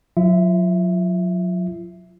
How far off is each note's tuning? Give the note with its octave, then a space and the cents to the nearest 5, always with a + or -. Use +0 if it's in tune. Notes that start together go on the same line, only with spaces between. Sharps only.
F#3 -35 F4 -40 E5 +0